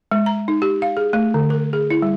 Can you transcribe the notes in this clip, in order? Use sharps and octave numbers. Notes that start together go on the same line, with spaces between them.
G#3
A#5
D#4
G4
F5
G#4
A3
D3
A#4
G#4
E4
G3